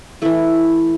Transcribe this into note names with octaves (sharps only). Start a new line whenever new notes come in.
E3 A3 E4